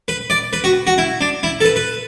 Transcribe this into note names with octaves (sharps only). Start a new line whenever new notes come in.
B4
D5
B4
F#4
F#4
E4
D4
E4
A4
B4
B4